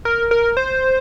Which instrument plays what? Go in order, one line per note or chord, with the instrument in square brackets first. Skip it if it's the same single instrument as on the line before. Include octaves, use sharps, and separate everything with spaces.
[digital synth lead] A#4
A#4
C5